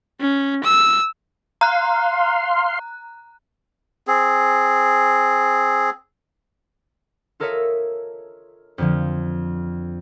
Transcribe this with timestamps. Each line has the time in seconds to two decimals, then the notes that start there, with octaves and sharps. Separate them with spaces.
0.20 C#4
0.64 E6
1.61 F5 A#5 C6 F#6
4.07 C4 G#4
7.40 F4 A4 A#4 C#5 D#5 E5
8.78 F2 D3 F3